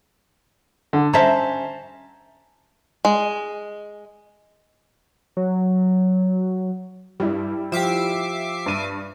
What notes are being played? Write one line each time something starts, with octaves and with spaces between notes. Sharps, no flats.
D3
C#4 C5 E5 A5 A#5
G#3
F#3
G2 G3 E4
F3 G4 E5 D6 C7
G2 D#7